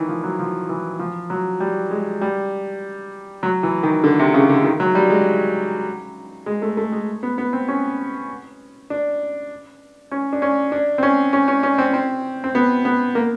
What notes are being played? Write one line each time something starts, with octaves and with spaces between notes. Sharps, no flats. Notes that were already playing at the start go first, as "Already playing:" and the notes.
Already playing: D#3 E3
F3
F#3
F3
E3
F3
F#3
G3
G#3
G3
F#3
E3
D#3
D3
C3
C#3
D3
D#3
F#3
G3
G#3
G#3
A3
A3
G#3
B3
B3
C4
C#4
D4
C#4
D4
C#4
D4
C4
C#4
C#4
C#4
C#4
C4
C4
C4
B3
B3
A#3